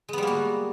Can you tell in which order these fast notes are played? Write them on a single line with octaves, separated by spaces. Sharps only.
G#3 B3 G3 A#3 F#4